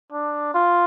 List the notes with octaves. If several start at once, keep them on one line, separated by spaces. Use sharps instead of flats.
D4
F4